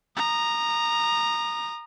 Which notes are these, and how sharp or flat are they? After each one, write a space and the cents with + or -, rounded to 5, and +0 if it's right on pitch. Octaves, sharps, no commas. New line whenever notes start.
A#5 +0 D#6 -30